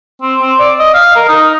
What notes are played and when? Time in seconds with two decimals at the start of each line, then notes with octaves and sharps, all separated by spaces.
0.22 C4
0.41 C4
0.60 D5
0.79 D#5
0.94 F5
1.16 A#4
1.29 D#4